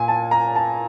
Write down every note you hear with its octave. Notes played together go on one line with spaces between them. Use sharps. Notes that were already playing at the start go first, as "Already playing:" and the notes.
Already playing: A#2 G#5
A5
A#5
A5